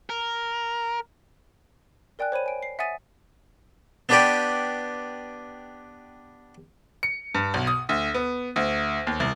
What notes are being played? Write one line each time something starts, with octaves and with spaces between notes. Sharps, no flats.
A#4
A#4 D5 G5 G#5 F#6
C5 C#5 B5 D#7
G#5 D7
C7
E5 F#5 G#5 D#6 A6 D#7
B3 D4 G4 B4 D5 G5
C#7
G2
B1
D#6
D2
B3
D2
D#2
C2